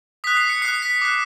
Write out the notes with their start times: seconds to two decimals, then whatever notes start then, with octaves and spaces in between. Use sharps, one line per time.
0.24 D#6 F#6 B6
0.37 C7
0.50 C#7
0.62 D#6 F#6 C7
0.82 B6
1.02 D6 F#6